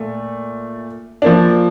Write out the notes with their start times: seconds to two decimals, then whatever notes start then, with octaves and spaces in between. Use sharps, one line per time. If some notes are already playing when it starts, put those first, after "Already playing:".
Already playing: A#2 A3
1.22 F3 A#3 D4